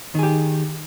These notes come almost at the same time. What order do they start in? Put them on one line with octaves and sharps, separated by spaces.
D#3 G#4 G4